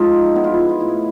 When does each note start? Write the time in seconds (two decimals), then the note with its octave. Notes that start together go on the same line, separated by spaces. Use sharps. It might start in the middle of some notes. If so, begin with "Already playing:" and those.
Already playing: G#2 F3 G#3 D#4 F4
0.35 B3 E4
0.44 F4
0.54 E4
0.69 F4
0.80 A2 E4